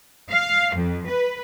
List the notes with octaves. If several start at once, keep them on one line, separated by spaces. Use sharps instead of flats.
F5
F2
B4